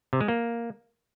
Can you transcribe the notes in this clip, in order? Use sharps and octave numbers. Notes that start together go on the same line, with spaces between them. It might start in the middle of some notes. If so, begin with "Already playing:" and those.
C3
G#3
A#3